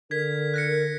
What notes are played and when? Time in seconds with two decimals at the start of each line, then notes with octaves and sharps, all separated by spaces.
0.11 D3 A#4 G#6 B6
0.54 F#6 A#6 C#7